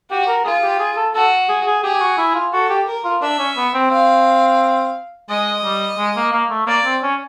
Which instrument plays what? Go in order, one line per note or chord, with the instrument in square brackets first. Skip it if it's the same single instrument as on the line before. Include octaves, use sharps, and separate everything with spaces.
[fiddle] F#4 [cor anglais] G4
[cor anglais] A#4
[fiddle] F4 [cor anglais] G#4
[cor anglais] G4
G#4
A4
[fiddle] F#4 [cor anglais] A4
[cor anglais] G#4
G#4
[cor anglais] G4 [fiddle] G#4
[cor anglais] G4
F#4
E4
F4
[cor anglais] F#4 [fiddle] A4
[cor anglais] G4
[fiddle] A#4
[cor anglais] F4
[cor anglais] D4 [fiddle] E5
[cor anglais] C#4
B3
C4
[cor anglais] C4 [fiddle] F5
[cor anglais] G#3 [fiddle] D#5
[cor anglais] G3
G#3
A#3
A#3
A3
[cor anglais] A#3 [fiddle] D5
[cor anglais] C4
C#4